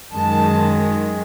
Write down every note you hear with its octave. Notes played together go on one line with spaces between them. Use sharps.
F#2 D#3 G#3 A5